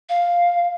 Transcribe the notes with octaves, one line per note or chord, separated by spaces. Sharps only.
F5